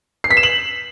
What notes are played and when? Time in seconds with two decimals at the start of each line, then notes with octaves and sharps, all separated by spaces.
0.24 C7
0.31 B6
0.37 E7
0.43 F#7